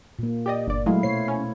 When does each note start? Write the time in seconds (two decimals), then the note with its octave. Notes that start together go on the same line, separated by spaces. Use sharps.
0.19 A#2 A#3
0.46 G4 D5 D#5
0.67 G1 D5
0.86 F#3 G#3 A3 E4 F5
1.03 B2 C5 C#5 C7
1.28 C#4